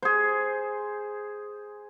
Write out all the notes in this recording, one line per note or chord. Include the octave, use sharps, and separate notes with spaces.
G#4 C5